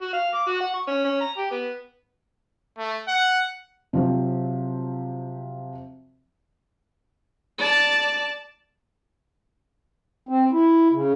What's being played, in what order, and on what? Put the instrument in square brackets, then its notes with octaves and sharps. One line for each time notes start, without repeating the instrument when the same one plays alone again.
[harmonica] F#4
F5
D6
F#4
F#5
C#6
C#4
C#4
A#5
G4
B3
[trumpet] A3
F#5
[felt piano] C3 F3 F#3 C4
[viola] D5 A5
[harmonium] C4
E4
C#3